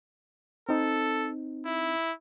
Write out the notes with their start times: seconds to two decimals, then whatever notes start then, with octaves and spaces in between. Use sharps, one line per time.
0.69 C4 D#4 A4
1.66 E4